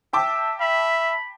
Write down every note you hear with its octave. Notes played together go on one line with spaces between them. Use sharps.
E5 G5 A5 D6
E5 B5